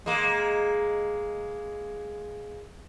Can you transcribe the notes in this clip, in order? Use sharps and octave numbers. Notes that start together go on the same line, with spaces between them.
G#3 A#3